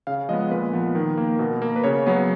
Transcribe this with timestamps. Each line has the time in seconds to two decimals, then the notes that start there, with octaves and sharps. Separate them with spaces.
0.07 C#3 F5
0.29 F3 G#3 B3 D#5
0.51 A#2 B4
0.73 F3 B3
0.95 D#3
1.18 A#3
1.39 B2
1.62 A#3
1.76 B4
1.84 C#3 C#5
2.06 F#3 B3